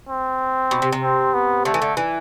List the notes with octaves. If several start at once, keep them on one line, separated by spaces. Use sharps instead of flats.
C4
B2
C3
C3
C4
B3
D3 A3
E3
D3
E3